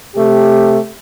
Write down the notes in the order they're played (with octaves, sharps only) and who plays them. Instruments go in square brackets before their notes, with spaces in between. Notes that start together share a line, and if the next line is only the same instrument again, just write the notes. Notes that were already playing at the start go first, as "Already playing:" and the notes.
[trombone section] C3 A3 G4